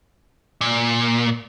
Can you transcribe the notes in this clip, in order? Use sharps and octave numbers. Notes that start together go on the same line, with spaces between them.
A#2